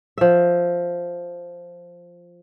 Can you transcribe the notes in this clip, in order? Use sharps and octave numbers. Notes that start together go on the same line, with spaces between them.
F3 E5